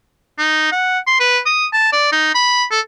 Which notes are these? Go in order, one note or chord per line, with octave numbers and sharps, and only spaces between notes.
D#4
F#5
C6
B4
D#6
A5
D5
D#4
B5
A4